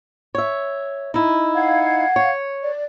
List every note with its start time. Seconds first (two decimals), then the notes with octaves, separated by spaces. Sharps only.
0.35 C#5 E5
1.14 D#4 E4
1.55 F5 F#5 G#6
2.16 C#5
2.63 D5